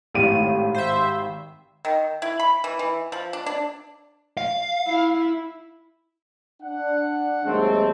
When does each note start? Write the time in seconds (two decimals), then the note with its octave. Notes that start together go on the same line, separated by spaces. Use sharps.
0.14 G#1 A2 G4 D#7
0.74 C5 E5
1.85 D#3
2.22 E4
2.40 B5
2.64 E3
2.79 E3
3.12 F3
3.33 D4
3.46 D4
4.37 F5
4.87 E4
6.62 D4 F#5
7.45 D#2 G#2 F#3 G#3 A3 C4